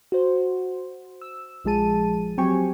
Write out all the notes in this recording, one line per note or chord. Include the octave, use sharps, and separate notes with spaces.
F#4 C5
E6
A#1 F3 G#3 G#4 A5 D#7
F#3 C4 G4 G5 G#5 C#6